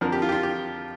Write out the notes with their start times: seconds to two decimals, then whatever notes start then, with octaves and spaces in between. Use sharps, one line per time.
0.01 F2 D3 F3 A#4
0.12 G4
0.22 F4
0.29 G4
0.32 F4
0.43 G4